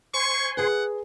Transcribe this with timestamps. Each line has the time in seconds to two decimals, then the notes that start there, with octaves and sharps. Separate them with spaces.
0.14 C5 G#5 C6 C#6
0.57 G#4 B4 F#5